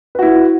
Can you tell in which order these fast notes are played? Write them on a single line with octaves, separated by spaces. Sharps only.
B4 F#4 E4